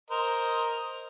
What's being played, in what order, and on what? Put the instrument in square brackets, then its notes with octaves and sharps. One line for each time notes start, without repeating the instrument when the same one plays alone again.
[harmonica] A#4 C5 D#5